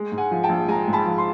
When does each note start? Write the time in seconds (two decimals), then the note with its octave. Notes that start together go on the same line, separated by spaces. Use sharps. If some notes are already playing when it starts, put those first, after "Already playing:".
Already playing: G#3
0.12 G#2
0.18 F#5 G#5
0.31 F3
0.43 G5 A5
0.49 A#1
0.68 G#3 G#5 A#5
0.88 G#2
0.93 A5 B5
1.06 F3
1.18 C6